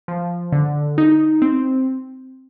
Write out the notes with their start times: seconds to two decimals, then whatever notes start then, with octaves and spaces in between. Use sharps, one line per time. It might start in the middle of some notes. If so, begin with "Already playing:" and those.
0.08 F3
0.52 D3
0.98 D#4
1.42 C4